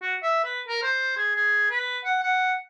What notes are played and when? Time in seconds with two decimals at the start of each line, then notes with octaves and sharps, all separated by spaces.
0.02 F#4
0.23 E5
0.44 B4
0.68 A#4
0.83 C5
1.17 G#4
1.36 G#4
1.70 B4
2.05 F#5
2.23 F#5